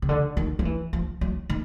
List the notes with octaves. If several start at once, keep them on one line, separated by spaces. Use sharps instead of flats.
C#3
D3
D#3
F3
E3
F3
F#3
D#3